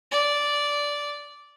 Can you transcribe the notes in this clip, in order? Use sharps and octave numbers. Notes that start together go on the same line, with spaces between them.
D5